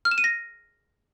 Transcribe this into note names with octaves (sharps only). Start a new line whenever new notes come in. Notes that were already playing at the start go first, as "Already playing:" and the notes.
F6
E7
D#7
A#6